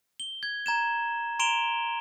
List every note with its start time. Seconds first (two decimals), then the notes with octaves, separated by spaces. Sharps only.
0.20 G7
0.43 G#6
0.66 A#5 G#6 E7
1.39 A#5 C6 D7 E7 F7 G7